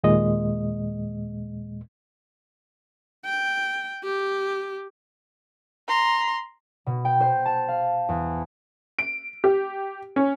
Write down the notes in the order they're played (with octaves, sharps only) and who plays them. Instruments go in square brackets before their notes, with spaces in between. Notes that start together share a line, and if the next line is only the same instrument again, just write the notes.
[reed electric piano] D#2 A#2 G#3 D#5
[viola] G5
G4
[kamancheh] A#5 C6
[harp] B2
G5
C5
A5
F5
E2
[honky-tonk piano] D7
G4
C#4